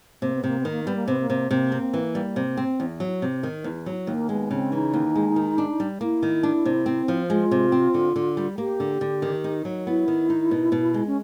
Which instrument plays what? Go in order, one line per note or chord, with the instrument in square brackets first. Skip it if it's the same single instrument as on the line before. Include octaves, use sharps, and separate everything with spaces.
[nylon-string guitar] C3 [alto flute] A#3
[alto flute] B3
[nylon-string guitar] C3 [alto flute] A#3
[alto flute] B3
[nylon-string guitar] D#3
[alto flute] A#3
[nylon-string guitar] G3 [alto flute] B3
[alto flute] A#3
[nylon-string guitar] C3 [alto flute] B3
[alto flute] A#3
[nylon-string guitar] C3
[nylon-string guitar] C3 [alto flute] A#3
[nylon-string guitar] C4
E3
G3
C3
C4
E2
F#3
C3
D#3
E2
F#3
[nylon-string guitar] D#2 [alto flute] A#3
[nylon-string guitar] G#3 [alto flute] B3
[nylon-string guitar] C#3 [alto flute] C4
[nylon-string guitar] E3 [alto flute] D#4
[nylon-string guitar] D#2
G#3
D#3
D4
G3
[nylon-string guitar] A#3 [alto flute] E4
[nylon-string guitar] D#3
D4
C3
C4
F3
[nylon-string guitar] G#3 [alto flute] F4
[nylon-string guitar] C3
C4
D3
D3
G3
[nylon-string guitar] A#3 [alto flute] G4
[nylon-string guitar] D3
D3
D#3
D#4
F#3
[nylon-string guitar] B3 [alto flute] E4
[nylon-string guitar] D#3
D#4
B2
B2
G#3
[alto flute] C#4